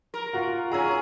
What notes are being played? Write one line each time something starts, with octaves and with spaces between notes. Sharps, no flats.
A#4
F4 F#4 F#5
C#4 G#4 A#5 E6